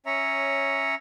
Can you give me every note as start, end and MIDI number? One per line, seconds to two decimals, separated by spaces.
0.06 0.95 61
0.06 0.95 73
0.06 0.95 76
0.06 0.95 82